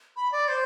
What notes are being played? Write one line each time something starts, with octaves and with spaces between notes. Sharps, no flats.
B5
D5
C5